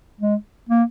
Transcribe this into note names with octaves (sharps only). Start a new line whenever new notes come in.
G#3
A#3